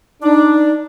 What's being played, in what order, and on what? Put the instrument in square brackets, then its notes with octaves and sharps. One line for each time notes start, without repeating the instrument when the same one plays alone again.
[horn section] D4 [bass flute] D#4